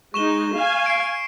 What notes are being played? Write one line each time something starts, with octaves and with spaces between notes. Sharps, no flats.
G#3 D#4 C#6 E7 G7
F5 G#5
C7 D7